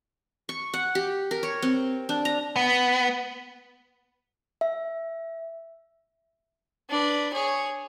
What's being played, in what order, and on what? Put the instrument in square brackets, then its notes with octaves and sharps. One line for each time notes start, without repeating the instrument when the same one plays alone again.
[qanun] C#6
F#5
G4
A#4
C#5
C4
D4
A#5
[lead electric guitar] B3
[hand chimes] E5
[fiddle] D4 B4
G#4 C#5